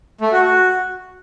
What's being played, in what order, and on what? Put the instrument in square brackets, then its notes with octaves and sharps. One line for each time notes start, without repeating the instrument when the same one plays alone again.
[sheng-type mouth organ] A3
F#4
F#4